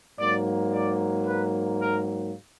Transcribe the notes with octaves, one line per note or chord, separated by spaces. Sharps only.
G#2 F#3 A#3 D5
D5
B4
A#4